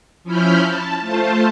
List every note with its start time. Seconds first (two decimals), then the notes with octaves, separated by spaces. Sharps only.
0.24 F3 C#4 E4 B5 F6 G6
0.62 A5
1.00 A3 F4 C5 A5